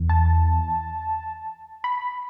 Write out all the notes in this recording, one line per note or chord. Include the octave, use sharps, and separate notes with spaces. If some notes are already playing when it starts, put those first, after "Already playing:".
Already playing: E2
A5
B5